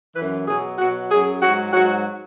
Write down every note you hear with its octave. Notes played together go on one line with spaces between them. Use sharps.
E3 B4
F#2
B2 F#3 G#4
B2 F#3 F#4
F#2 F#3 G#4
G#2 F#3 F#4
G#2 F#3 F#4